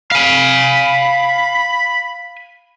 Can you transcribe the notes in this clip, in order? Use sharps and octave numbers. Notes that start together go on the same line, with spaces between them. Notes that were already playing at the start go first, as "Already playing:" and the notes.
F5 G#5 B5